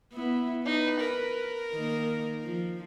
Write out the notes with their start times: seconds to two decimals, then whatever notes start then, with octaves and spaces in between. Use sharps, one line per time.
0.13 B3 E4
0.65 D#4 B4
0.99 A#4
1.72 D#3 A#3
2.44 F3